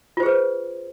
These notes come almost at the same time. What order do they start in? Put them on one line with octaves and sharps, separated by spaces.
F4 C5 G#4 B4